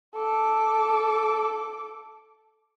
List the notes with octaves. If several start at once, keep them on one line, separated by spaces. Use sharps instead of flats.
A4 D6